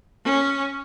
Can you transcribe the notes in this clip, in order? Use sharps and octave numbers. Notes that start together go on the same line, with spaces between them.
C#4